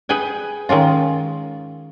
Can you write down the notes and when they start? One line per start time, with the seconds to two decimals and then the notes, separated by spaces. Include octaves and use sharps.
0.09 G#4 B4 G5 G#5
0.69 D#3 G#3 C#4 F4